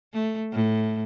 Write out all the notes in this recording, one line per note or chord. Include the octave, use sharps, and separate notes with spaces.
A3
A2